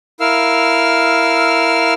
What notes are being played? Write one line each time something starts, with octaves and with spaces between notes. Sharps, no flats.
E4 A#4 F5 E6 F6